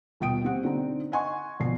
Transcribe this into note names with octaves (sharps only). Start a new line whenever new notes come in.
D#1 B2 F4 G5 D#6 D7
C4 G4 F#5
D3 C4 D#4
D#5 F#5 G#5 C6 C#6
A#1 B2 C7